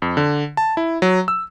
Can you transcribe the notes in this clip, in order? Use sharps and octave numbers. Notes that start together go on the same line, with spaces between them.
F2
D3
A5
E4
F#3
E6